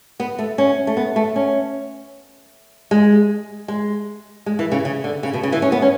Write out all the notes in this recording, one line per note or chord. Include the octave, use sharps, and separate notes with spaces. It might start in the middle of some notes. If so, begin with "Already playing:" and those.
B3
A3
C#4
A3
B3
A3
C#4
G#3
G#3
G#3
E3
C#3
C#3
D3
C#3
B2
C#3
E3
C#4
B3
C#4